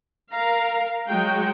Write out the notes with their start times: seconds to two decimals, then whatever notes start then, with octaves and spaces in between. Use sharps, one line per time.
0.31 A#4 F5 A#5
1.07 F#3 G#3 F#4 G5